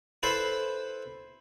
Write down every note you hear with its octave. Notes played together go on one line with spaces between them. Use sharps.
E4 A4 B4 C5 E5